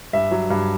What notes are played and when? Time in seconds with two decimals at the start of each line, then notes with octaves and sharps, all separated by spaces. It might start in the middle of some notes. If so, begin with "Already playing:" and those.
0.13 G2 E5
0.31 F#3
0.50 G2